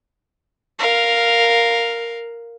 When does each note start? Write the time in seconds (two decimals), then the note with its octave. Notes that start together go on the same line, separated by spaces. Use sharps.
0.79 A#4 F5